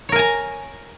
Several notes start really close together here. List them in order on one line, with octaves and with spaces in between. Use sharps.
C#5 A#4 G#5 A#5